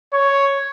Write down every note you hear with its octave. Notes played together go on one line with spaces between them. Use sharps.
C#5